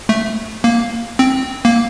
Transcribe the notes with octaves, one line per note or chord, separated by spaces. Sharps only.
A3
A#3
C4
A#3